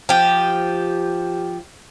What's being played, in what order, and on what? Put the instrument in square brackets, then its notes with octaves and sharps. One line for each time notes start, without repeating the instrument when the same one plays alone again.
[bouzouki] F3 G4